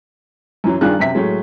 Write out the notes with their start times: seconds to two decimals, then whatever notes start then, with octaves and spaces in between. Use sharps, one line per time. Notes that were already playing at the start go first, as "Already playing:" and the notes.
0.64 F#2 E3 F#3
0.81 G2 D#3 D4 F4 G#4 F#6
0.99 F#2 C3 E5 B6
1.14 A2 F#3 G#3